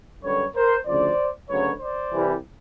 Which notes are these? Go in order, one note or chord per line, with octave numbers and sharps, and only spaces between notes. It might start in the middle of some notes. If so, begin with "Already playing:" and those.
F#2 D3 G3 B4 C#5
A#4 C5
D2 C#3 F3 C5 D5
D2 C#3 F#3 B4 C#5
C5 D5
C2 C3 E3 G3